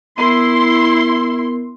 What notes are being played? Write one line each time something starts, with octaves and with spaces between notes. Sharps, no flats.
B3 E4 A#4 C6